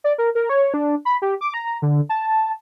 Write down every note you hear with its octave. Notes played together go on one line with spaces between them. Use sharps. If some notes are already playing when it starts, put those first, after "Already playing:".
D5
A#4
A#4
C#5
D4
B5
G4
D6
A#5
D3
A5